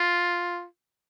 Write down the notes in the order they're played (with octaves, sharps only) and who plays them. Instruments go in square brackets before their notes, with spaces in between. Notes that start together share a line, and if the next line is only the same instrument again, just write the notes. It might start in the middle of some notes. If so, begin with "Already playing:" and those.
Already playing: [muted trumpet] F4